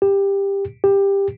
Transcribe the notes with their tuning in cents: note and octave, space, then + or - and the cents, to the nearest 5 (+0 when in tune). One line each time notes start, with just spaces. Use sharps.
G4 +15
G4 +15